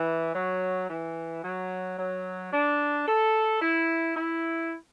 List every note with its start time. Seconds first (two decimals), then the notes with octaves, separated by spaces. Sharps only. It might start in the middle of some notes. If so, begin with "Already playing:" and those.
Already playing: E3
0.35 F#3
0.90 E3
1.44 F#3
1.99 F#3
2.53 D4
3.08 A4
3.62 E4
4.17 E4